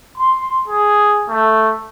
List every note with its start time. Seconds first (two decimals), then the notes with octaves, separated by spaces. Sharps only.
0.18 C6
0.68 G#4
1.29 A3